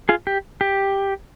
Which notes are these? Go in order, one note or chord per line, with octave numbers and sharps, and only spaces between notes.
F4 G#4
G4
G4